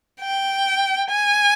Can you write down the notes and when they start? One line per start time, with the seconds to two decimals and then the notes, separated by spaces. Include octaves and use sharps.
0.21 G5
1.10 G#5